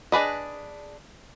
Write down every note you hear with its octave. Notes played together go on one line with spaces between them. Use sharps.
D4 G#4 B4 D#5